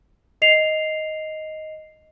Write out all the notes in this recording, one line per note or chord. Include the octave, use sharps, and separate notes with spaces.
D#5 C7 F7